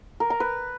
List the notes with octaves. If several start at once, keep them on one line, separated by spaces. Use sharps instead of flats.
A#4
A#5
B4